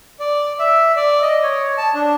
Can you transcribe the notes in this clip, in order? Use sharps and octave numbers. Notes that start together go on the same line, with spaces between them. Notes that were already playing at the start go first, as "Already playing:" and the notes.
D5
E5
D5
D#5
C#5
A5
D4